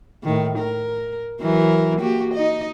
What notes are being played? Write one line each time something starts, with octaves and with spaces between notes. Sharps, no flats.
A2 D#3
A#4
E3 F#3 A#4
A#3 F#4 G4
D#4 D#5